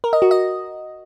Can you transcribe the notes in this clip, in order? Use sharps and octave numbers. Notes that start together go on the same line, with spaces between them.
A#4
D#5
F#4
D#5